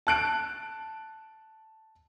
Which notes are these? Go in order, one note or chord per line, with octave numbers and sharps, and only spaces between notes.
A5 F#6 D7